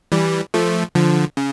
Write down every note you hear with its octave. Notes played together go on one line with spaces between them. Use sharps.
E3 G3
F3 A3
D3 F3
C#3